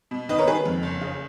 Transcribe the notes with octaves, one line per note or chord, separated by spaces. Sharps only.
B2
D#3 B4 D#5
A#4 C#5
D#3 G#4 B4
F2
F#1
C#3